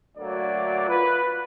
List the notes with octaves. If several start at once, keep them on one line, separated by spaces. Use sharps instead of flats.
D2 D3 F#3 A#3 D5
F4 B4